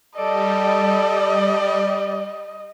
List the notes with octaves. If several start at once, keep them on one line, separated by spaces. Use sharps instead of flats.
G3 A4 D5 D#5